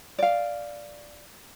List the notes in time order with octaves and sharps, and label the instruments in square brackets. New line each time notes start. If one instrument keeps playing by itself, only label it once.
[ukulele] D5 F5